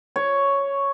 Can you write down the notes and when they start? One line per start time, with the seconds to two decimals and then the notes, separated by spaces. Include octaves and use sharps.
0.16 C#5